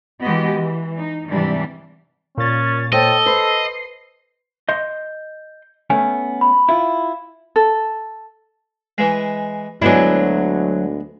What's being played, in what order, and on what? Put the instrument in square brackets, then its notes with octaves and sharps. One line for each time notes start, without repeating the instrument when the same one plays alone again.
[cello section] E3 G#3 B3 F#4 G4 D#5
E3
D#4
G#2 C3 E3 G3 D4
[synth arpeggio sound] A#2 A6 [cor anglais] C#4
[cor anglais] A4 [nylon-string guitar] C5 C#5 G5 [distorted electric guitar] D#5
[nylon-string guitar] B4 C5 [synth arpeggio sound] C7
[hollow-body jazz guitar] D#5 C6 [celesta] G6
[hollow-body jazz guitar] A3 B3 C#4 [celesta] G#5
[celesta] B5
[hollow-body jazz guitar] E4 F4
[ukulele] A4
[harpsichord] E3 G#3
[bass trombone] D2 [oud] F#3 E4 [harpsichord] G#3 B3 D4